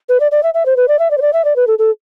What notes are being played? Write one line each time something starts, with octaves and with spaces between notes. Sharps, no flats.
B4
D5
D5
E5
E5
C5
B4
D5
E5
D5
C5
D5
E5
D5
B4
A4
A4